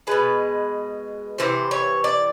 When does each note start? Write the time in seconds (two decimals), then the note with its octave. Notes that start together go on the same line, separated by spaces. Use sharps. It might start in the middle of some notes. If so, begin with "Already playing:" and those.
0.07 B2 G#3 B4
1.38 C3 E3 C5
1.71 C#5
2.04 D5